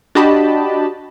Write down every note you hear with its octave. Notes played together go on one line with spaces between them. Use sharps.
D4 F#4 G4 D#5 A5 B5